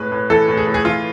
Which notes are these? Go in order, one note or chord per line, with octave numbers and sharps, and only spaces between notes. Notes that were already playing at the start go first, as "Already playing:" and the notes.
Already playing: A2 G#3 B4
A2
E3 A4
A2
G#4
A2
G#4
E3 F4